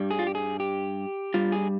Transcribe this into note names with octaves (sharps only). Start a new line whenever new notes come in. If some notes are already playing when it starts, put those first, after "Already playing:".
Already playing: G2 G3
G#4
F4
G4
G#4
G4
G2 G3 F4
G#4